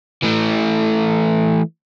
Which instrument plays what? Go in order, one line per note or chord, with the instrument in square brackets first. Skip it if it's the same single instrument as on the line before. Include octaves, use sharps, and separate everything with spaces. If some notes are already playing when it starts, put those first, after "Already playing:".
[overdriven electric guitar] E3 A3